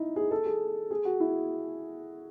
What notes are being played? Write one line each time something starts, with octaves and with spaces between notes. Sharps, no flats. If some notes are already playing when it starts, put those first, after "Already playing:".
Already playing: D#4 E4
G#4
A4
G#4
G#4
F#4
E4